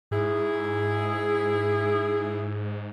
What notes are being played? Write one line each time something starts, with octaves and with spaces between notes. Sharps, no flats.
G#2 E4 G#4